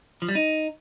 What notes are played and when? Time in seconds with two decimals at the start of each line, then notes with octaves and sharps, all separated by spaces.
0.22 F3
0.29 G3
0.35 D#4